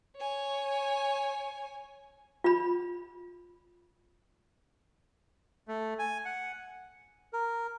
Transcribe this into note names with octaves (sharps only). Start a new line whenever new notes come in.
C#5 G#5
F4 B5
A3
G#5
F#5
A#4